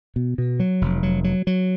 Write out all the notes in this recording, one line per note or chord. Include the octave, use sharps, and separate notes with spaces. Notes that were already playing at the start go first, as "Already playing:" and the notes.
B2
B2
F#3
F1
F#3
F#3
F#3